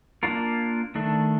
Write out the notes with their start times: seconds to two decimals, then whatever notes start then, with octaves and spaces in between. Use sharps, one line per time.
0.23 A#3 D4 F4 A#4
0.95 D#3 A3 D4